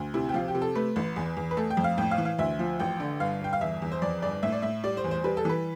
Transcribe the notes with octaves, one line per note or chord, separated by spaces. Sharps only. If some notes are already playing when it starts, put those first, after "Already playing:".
Already playing: D2
C3 E4
G4
F3 F4
G4
C3
A4
A3 B4
A1
E2
E2
B4
A3 A4
G5
F2
F5
A2 G5
F5
E3
F5
D2 E5
F3
A1 G5
D3
G1 F5
G1 G5
F5
E2 E5
E2
C5
F2 D5
G1 D5
A2 E5
D5
A2 E5
G3 D5
C5
E2
C5
G3 B4
A4
E3 B4